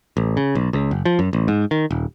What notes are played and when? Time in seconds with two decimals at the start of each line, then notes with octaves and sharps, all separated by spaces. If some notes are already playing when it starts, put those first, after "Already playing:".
0.17 A1
0.37 C#3
0.55 B1
0.73 C#2
0.91 F#1
1.05 F3
1.19 F#2
1.33 A1
1.48 G#2
1.71 D#3
1.91 D#1